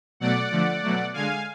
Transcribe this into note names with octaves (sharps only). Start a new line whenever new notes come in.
B2 F#3 A3 D5 F#5
D3 F3 A3
B2 F#3 A3
D3 G#3 F5 G#5